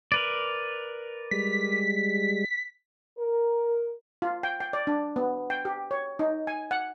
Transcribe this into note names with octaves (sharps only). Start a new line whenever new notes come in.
A#4 B4 D5
G3 G#3 B6
A#4
F4
G5
G5
D5
D4
B3
G5
G4
C#5
D#4
G#5
F#5